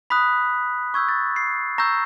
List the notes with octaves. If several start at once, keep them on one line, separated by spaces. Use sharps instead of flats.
B5 D#6 F#6 B6
C#6 E6 G6 G#6
A6
C7
A#5 C#6 E6 G6 A#6